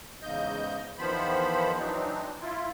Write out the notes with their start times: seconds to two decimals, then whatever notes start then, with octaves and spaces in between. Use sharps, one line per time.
0.22 E2 G#2 C#3 D#5 G6
0.98 E2 D#3 F3 B3 C5 B5
1.78 E3 F#3 C4 D4 D#4
2.41 E4 F4